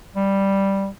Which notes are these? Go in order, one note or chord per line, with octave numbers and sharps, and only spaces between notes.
G3